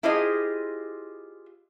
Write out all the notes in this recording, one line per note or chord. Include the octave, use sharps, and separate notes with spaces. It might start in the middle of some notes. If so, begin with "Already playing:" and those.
E4 F4 G4 G#4 C5 D#5